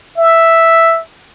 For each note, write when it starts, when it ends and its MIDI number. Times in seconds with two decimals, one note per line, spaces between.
0.18 1.00 76